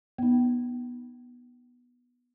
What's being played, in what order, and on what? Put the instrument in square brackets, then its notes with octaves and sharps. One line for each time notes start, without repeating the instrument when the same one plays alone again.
[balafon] B3 D#4